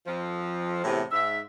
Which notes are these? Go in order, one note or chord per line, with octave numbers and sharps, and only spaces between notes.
F2 F3
E2 A2 C3
G#2 E5